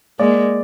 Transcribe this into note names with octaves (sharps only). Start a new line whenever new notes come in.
G#3 A#3 D5